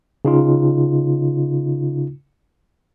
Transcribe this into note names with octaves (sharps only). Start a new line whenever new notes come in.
C#3 D#4 F4